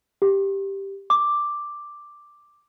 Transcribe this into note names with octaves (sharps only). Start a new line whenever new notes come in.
G4
D6